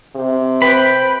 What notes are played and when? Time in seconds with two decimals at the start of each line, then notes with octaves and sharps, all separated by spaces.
0.15 C3
0.62 B4 C5 G5 B5 D7